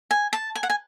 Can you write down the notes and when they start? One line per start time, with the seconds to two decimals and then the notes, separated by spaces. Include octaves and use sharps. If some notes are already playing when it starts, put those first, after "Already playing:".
0.11 G#5
0.33 A5
0.55 G#5
0.63 F#5
0.70 G#5